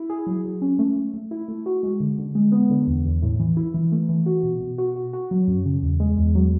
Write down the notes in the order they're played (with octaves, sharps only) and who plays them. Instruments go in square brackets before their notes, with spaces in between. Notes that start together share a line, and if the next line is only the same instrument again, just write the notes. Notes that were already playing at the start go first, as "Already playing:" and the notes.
Already playing: [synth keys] E4
G#4
F#3
F#3
C#4
A3
A3
A3
E4
A3
F#4
G#3
D3
D3
G#3
B3
D3
E2
E2
A2
E3
E4
E3
A3
E3
F#4
B2
B2
F#4
F#4
F#4
F#3
F#2
C#3
E2
G#3
E2
F#3